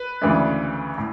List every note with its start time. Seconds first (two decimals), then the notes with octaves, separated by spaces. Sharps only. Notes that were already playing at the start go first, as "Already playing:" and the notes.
Already playing: B4
0.21 D2 C#3 E3 A3 D4
0.98 A2